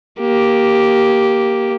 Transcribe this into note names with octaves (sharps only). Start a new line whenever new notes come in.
A#3 G4